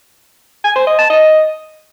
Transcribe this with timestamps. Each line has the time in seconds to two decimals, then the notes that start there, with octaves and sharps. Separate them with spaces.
0.64 G#5
0.75 C5
0.87 D#5
0.99 A5
1.10 D#5